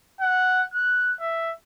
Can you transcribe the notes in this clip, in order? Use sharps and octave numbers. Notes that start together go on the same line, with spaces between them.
F#5
F#6
E5